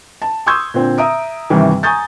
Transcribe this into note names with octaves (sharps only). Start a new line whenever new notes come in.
A5
C6 C#6 D#6 E6 G6 G#6
A#2 D3 C4
E5 A#5 D#6 D7
G1 C2 C3 D#3 E3
G#5 A#5 C#6 D#6 G6 A6